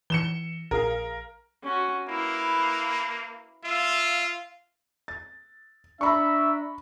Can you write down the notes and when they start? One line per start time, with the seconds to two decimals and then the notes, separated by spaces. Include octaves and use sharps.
0.10 E3 C#7 E7 G7
0.71 A#1 G#4 A#4 F5
1.63 C#4 F#4
2.09 A#3 E4 B4
3.65 F4 E5 F5
5.08 A6
6.01 D4 E5 A#5 B5 C#6